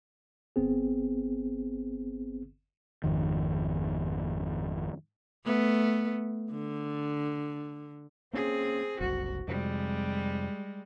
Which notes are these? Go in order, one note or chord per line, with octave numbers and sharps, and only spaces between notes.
G1 B3 C4 G#4
G#1 F2 D#3
A3 B3
D3
A#3 C4 C#4 G#4
F#1 C2 F#4
F2 C3 G3 G#3